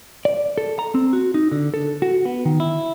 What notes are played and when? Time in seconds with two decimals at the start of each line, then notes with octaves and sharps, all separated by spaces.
0.25 D5
0.58 A4
0.79 A#5
0.95 C4
1.13 F#4
1.34 D#4
1.52 D3
1.74 A4
2.02 F#4
2.25 B3
2.45 D#3
2.60 E4